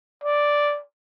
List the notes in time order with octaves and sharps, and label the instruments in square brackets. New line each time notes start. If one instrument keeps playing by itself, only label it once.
[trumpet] D5